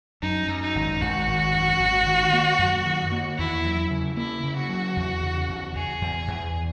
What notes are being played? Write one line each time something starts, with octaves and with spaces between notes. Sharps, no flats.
F#2 D#4
F#2
D#4
G#1
G#1 F#4
G#1
F#2
G#1
D#3
A#3
F#2
D#3
A#3
E2 E4
F#3
C#3
A#3 E4
C#3
F#4
F#3
E2
C#3
E2
E2 G#4
E2
E2